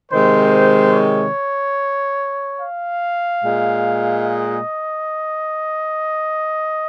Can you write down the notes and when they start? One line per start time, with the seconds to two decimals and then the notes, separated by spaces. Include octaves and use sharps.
0.10 C3 D#3 G#3 C5
0.93 C#5
2.59 F5
3.42 A#2 G#3
4.25 D#5